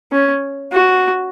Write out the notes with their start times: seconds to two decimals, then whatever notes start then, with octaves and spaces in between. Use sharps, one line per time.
0.12 C#4
0.73 F#4